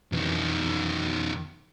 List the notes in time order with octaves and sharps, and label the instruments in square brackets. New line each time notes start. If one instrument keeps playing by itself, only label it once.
[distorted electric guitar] B1 D#3 [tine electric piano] F2 E3